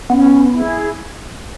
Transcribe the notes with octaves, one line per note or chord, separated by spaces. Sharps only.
B3 C#4
E4 G#4